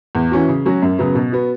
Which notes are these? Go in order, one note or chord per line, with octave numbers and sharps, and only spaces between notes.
E2
E3 C#4 F#4
C#3
F#3 C#4 F#4
F#2
C#3 F#3 B3
B2
B3 F#4